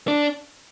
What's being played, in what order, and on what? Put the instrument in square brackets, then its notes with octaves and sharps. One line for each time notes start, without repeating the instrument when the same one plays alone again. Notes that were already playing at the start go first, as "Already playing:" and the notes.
[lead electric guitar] D4